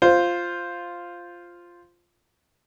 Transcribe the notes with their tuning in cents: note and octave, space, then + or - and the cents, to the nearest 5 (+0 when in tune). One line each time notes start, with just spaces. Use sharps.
F4 +0 C5 +0